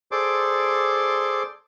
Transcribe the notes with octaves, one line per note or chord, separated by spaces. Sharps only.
G#4 A4 C5 D5 C6 D6